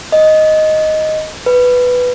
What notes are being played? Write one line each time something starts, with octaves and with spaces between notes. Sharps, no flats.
D#5
B4